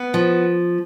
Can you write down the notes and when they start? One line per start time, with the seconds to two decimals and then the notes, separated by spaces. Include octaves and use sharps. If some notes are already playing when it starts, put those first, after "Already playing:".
Already playing: B3
0.14 F3